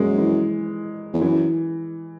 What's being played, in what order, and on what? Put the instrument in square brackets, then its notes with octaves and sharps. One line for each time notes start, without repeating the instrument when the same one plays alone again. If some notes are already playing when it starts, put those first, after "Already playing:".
Already playing: [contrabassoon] F#2 [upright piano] G#3 A#3
[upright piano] E3
[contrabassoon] E2
[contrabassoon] F#2 [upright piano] E3